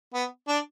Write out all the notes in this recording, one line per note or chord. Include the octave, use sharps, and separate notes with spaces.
B3
D4